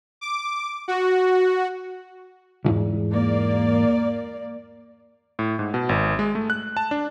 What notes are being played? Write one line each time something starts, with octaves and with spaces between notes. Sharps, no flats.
D6
F#4
B1 E2 G#2
A#3 D5
A2
G#2
B2
G#1
G#3
A3
F#6
A5
D4